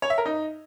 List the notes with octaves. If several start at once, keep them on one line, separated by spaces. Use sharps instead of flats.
C#5
E5
A#4
D#4